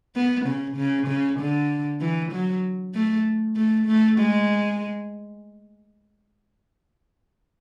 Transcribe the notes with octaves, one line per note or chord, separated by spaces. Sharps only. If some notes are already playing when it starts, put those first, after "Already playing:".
B3
C#3
C#3
C#3
D3
E3
F#3
A3
A3
A3
G#3